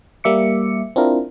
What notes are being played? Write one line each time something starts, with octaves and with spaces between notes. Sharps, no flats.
G3 A#3 E5 D6 C#7
C4 D4 E4 F4 A#4